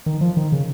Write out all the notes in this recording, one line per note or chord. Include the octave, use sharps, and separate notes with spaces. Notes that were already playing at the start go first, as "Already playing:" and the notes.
D#3
F3
D#3
C#3